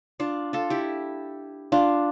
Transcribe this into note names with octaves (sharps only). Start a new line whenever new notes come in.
D4 F4
F4 A4
E4 G4
D4 F4